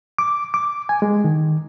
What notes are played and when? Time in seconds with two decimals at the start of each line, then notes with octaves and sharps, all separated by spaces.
0.19 D6
0.54 D6
0.89 G#5
1.02 G#3
1.25 D#3